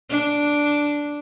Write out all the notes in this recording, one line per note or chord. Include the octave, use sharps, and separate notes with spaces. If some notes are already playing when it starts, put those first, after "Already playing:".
D4